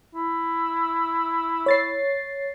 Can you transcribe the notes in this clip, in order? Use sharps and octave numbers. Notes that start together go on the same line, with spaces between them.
E4
C#5 A6 C7